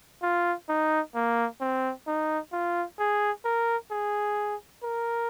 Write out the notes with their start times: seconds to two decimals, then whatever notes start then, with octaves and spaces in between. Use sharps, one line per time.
0.22 F4
0.69 D#4
1.15 A#3
1.60 C4
2.07 D#4
2.52 F4
2.99 G#4
3.45 A#4
3.91 G#4
4.83 A#4